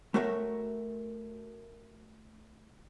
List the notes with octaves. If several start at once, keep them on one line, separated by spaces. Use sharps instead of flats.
A3 F#4 A#4 C#5 E5